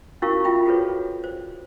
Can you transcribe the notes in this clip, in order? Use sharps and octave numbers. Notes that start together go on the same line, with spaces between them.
C#4 E4 F#4 A#4 F5 C#6
F4 E5 G5 B5
F#4 G#4 A4 B4 C#5
C5